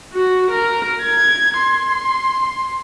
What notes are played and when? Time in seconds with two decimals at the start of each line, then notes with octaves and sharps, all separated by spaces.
0.14 F#4
0.51 A#4
1.02 G#6
1.59 C6